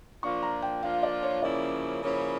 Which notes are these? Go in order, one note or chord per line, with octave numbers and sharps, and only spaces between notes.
F3 A#3 D4 F4 C#6
A#5
G5
F3 A#3 D4 F4 F5
D5
C#5
C#3 F3 A#3 C#4 E4 D5
C#3 F3 A#3 C#4 E4